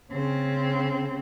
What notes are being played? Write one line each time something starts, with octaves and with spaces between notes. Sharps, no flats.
C#3 C4